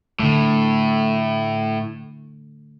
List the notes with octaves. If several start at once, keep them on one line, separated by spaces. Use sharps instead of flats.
A2 D3 A3